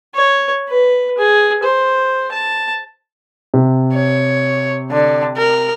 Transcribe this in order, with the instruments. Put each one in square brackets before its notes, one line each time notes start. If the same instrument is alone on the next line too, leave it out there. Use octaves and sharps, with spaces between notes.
[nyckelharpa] C#5
B4
G#4
C5
A5
[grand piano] C3
[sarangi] C#5
D3
A#4